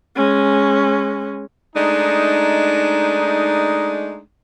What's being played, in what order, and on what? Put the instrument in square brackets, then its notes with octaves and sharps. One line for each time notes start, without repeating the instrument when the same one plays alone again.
[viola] G#3 C#4
[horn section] G#3 A3 D4 D#4